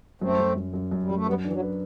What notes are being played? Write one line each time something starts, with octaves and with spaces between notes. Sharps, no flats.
F#2 A3 C4
F#2
F#2
F#2
F#2
G3
F#2
A3
G3 B3 F#4
E3 D4
F#3
B4